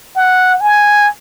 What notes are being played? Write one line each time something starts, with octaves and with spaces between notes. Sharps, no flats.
F#5
G#5